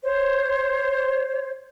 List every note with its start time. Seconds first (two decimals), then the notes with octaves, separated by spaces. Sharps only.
0.03 C5 C#5